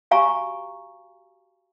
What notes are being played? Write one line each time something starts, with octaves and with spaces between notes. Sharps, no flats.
F#4 G4 F5 G#5 A#5 C#6